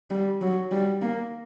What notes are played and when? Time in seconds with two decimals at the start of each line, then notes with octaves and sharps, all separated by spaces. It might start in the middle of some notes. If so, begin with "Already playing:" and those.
0.10 G3
0.41 F#3
0.72 G3
1.02 A#3